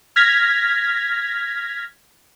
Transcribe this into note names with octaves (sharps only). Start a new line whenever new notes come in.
F6 G#6 A#6 B6